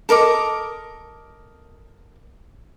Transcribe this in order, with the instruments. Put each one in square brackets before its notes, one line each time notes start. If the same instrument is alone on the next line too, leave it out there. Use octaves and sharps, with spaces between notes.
[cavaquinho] A4 A#4 D#5 D6